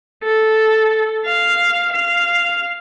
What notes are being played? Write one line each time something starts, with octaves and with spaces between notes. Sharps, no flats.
A4
F5
F5